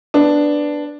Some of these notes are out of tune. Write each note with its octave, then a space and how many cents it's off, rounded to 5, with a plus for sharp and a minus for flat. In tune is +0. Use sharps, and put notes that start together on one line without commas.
B3 +0 D4 +0